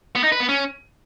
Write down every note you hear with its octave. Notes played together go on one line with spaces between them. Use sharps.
B3
D#4
B4
B3
C#4